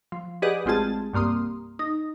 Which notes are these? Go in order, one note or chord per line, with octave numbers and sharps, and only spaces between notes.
F3
G4 G#4 B4 D5 D#5 F#5
A1 G#3 C4 F4 G#4 A5
C2 G2 A#3 C6 D#6
D#4